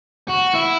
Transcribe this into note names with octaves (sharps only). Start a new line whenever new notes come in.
F#4
E4